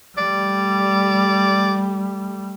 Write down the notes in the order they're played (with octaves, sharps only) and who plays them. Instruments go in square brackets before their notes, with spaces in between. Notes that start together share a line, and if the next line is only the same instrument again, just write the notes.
[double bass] G3 A3 [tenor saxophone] D5